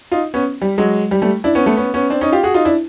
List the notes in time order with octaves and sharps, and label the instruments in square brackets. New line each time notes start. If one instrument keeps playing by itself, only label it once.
[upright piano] D#4 F4
B3 C#4
G3
F#3 G#3
G3
G3 A3
D4 E4
B3 C#4
A3 B3
B3 C#4
B3 C#4
C4 D4
C#4 D#4
F4 G4
F#4 G#4
D#4 F4
D4 E4